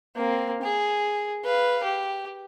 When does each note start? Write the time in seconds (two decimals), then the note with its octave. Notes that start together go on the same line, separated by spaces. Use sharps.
0.16 A#3 C4
0.62 G#4
1.44 B4 F5
1.83 G4